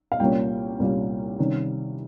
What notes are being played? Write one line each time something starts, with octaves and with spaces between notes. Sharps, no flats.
F5
C2 A#2 G3 A#3 C#4 G5
C2 A#2 G3 A#3 C#4
C3 D#3 G3 C#4